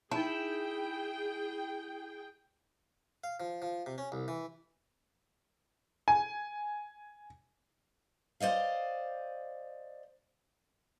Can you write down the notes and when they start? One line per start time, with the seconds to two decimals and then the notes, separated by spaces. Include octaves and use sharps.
0.11 D#4 E4 G#4 G5 A5
3.24 F5
3.40 F3
3.62 F3
3.86 C3
3.98 C#4
4.12 C2
4.28 E3
6.08 G#5
8.40 C5 D5 D#5 F5